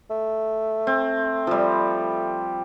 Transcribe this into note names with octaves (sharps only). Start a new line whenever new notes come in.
A3
C4
F3 G3